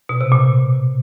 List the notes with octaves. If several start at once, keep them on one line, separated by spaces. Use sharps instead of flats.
B2
C3
A#2